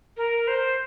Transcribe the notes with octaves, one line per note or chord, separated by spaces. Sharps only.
A#4
C5